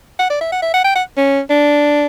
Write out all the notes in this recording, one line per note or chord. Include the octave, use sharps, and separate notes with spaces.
F#5
D5
E5
F#5
E5
F#5
G5
F#5
C#4
D4